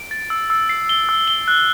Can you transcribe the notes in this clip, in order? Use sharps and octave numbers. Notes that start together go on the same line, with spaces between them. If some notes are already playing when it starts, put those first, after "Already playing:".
Already playing: D7
A6
E6
E6
C7
G7
E6
G7
F#6